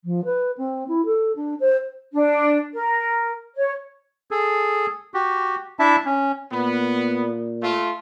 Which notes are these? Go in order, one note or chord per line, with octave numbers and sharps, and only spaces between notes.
F3
B4
C4
E4
A4
D4
C5
D4
A#4
C#5
G#4 A4
F#4 G4
D4 E4 E5 A5
C#4
A#2 B3
A3 F4